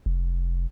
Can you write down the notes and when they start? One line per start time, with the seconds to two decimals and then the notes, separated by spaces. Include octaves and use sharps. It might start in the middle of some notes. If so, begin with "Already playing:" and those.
0.06 F1